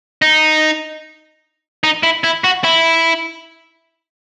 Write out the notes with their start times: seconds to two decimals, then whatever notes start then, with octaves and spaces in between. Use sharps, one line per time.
0.22 D#4
1.84 D#4
2.03 E4
2.24 E4
2.44 F#4
2.64 E4